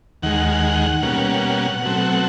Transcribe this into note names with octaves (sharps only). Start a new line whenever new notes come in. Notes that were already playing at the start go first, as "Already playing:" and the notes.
D#2 D#3 G#3 F#5
B2 G3 A#3 C#4
B2 F#3 A3 C4